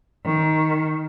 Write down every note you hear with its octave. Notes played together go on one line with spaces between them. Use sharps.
D#3